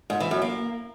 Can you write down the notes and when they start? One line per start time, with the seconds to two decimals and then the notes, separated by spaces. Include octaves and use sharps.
0.10 G#2
0.20 E3
0.31 F#2
0.42 A#3